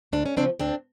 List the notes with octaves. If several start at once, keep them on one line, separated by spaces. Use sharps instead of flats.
D2 D4
C#4
C#3 F3 C4 D4
D2 C4 D4